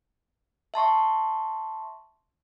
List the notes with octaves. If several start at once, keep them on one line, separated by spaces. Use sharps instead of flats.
E5 A5 C6 C#6